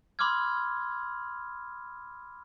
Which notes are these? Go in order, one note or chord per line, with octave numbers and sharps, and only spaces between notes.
B5 C6 D6 E6 F6 G#6